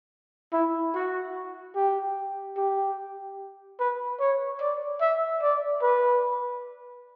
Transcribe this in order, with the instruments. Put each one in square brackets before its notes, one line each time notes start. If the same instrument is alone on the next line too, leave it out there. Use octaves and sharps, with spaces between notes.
[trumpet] E4
F#4
G4
G4
B4
C#5
D5
E5
D5
B4